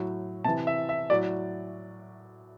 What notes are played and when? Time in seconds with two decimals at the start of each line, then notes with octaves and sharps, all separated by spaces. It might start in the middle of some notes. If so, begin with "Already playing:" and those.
Already playing: A2 F#3
0.44 C3 E3 A5
0.67 E5
0.89 E5
1.10 A2 F#3 D5